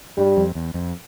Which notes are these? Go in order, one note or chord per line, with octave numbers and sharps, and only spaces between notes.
G2 G3
F2
E2
F2